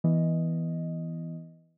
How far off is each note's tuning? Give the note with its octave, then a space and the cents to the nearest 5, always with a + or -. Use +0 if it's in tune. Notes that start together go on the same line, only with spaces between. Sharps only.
E3 +0 B3 +0 D#5 +0